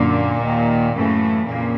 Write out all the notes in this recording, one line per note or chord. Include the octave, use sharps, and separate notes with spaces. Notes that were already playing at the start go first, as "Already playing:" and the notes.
Already playing: F#2 A#2 D3 A#3
D#2 D#3
F#2 A2 C#3 E3 A3
F2 A#2 C#3 A#3